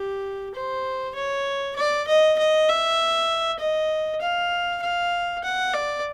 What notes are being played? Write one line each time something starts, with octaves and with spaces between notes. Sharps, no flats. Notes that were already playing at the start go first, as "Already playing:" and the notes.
Already playing: G4
C5
C#5
D5
D#5
D#5
E5
D#5
F5
F5
F#5
D5